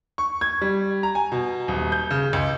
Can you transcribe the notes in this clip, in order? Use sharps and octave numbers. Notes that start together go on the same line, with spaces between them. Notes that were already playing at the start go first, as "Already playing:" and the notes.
C#6
G#6
G3
A#5
G#5
B2
D#1
G6
C#3
C#2